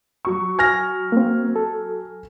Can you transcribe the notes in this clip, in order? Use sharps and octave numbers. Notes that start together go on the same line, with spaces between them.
F#3 C#6
G#5 F6 A#6
A#3 C4
A4